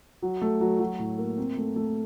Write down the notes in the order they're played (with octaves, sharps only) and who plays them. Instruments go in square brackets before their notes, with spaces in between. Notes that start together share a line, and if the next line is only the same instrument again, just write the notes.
[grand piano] F#3
A3
F#3
F#3
A2
A#3
C4
A3
A3